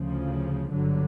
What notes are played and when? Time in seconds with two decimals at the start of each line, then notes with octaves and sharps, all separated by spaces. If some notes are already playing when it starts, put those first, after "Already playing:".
Already playing: D2 C#3 F3
0.70 G1 G2 D3 F#3